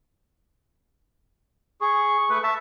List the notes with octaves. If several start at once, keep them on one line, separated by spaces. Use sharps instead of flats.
G#4 C#6
A3 B4
E5 A5